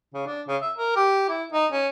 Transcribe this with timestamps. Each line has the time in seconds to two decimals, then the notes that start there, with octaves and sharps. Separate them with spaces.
0.14 C#3
0.26 D4
0.48 C#3
0.62 E5
0.77 A#4
0.96 G4
1.30 E4
1.52 D#4
1.72 C#4